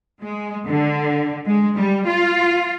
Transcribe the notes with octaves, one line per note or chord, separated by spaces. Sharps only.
G#3
D3
G#3
G3
F4